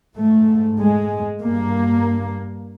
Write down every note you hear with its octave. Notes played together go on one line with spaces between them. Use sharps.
G#2 A3
G#3
G2 A#3